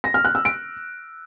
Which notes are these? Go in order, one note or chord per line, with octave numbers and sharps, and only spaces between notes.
A#6
F6
F#6
E6
D7